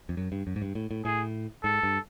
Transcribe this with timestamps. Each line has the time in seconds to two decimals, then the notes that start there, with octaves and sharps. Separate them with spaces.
0.09 F2
0.17 F#2
0.32 G2
0.47 F#2
0.56 G#2
0.62 G2
0.75 A2
0.91 A2
1.05 A2 G#4
1.64 G#2 A4
1.83 G2